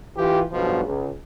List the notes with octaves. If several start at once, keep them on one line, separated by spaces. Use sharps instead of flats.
E3 F4 G4
B1 G2 B2 F3
C#2